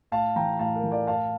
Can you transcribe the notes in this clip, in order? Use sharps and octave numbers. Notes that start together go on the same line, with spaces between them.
A2 F5 A5
E3 G5 A#5
A2 F5 A5
A#4
E3
D5 F5
A2 F5 A5